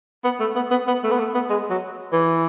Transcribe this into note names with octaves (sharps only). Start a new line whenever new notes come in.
B3
A3
B3
B3
B3
A3
B3
A3
B3
G#3
F#3
E3